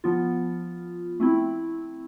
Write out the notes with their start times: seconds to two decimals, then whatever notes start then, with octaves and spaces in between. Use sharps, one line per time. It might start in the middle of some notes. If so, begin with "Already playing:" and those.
0.04 F3 B3 F4
1.20 A3 C4 E4